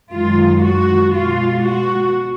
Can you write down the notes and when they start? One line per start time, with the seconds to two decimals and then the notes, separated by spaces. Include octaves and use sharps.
0.11 F#2 D#3 G#3 F4
0.63 F#4
1.14 B2 G#3 F4
1.64 F#4